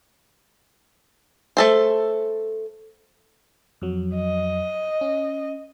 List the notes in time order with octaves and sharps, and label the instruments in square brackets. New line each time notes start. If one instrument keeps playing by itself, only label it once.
[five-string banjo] A3 A4 C5
[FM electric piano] F2 F#3
[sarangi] D#5
[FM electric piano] C#4